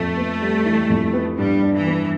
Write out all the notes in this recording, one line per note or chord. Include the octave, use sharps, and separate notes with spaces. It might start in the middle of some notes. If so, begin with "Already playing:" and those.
Already playing: F2 A3
B3
G3
E3
F2
B3
G2 G3
D4
E3
B3